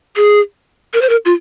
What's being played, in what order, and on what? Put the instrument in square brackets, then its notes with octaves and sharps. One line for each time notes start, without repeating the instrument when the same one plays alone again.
[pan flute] G#4
A#4
C5
A#4
F4